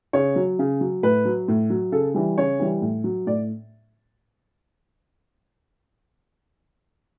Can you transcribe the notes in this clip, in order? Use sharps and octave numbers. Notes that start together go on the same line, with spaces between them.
C#3 C#5
F#3
C#3
F#3
A2 B4
F#3
A2
F#3
C#3 A4
E3 G3
C#3 C#5
E3 G3
A2
F#3
A2 D5